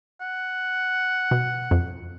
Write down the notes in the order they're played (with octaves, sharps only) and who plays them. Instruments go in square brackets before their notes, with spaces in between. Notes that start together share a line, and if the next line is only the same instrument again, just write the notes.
[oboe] F#5
[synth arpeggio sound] B2
F2